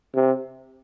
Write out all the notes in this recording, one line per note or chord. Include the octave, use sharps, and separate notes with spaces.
C3